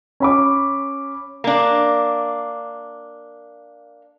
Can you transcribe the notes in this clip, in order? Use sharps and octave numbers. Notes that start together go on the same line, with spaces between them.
C#4 B5 D6
A#3 D4